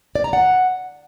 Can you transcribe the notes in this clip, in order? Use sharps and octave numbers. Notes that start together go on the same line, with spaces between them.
D5
A#5
F#5